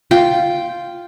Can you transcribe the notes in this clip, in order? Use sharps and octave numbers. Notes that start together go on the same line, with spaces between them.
F4 G5